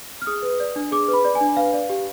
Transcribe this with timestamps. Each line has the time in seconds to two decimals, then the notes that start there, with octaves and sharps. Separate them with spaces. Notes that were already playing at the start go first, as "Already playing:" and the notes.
0.22 F6
0.27 G#4 D#6
0.42 B4
0.60 D5
0.76 D4
0.92 G#4 D6
1.08 B4
1.13 B5
1.25 D5
1.35 G#5
1.41 D4
1.56 B4 F5
1.73 D5
1.90 G4